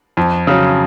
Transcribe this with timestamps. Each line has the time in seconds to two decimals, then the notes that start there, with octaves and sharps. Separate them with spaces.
0.17 F2
0.47 C#3 F#3